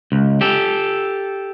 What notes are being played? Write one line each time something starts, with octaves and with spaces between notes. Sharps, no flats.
C#2
G4 A4